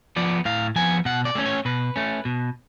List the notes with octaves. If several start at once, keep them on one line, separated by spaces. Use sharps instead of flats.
F3 B3 D5
A2 F5
F3 B3 G#5
B2 F#5
D5
A3 C#4
C#5
B2 B4
A3 C#4
B2